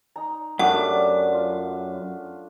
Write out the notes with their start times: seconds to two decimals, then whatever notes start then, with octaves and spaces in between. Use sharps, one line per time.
0.16 D#4 A#5
0.59 F#2 G3 A3 D4 F#5
1.32 F4